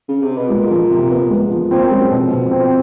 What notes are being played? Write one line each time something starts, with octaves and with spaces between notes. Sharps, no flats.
C#3
C3
B2
A#2 G#3
F3
C3
B3
G#3
F3
A#2 C4
F#2 G#3
F2 B2
B2
C4